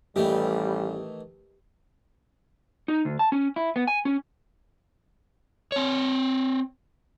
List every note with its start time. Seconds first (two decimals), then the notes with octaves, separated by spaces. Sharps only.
0.16 A1 D#3 E3 G3 A3 G4
2.88 D#4
3.05 D2
3.19 A5
3.32 C#4
3.56 E4
3.76 B3
3.87 G#5
4.05 C#4
5.72 C4 C#5